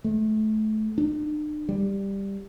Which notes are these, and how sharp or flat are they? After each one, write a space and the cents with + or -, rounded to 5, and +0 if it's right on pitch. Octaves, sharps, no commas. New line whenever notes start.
A3 -25
D4 +45
G3 +10